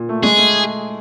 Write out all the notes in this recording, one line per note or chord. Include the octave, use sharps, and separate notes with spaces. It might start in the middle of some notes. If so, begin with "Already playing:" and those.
Already playing: A#2
A3
G#3 G#4
A3